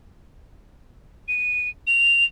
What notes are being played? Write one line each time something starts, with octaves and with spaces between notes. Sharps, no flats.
D#7
F7